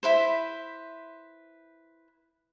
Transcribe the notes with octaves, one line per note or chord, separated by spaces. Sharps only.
E4 B4 C5